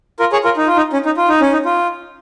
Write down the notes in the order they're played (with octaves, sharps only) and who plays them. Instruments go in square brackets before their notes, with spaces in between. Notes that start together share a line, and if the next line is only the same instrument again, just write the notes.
[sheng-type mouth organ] F4 A#4
G#4 C#5
F4 A#4
D#4
F4
D#4
C#4
D#4
F4
D#4
C#4
D#4
F4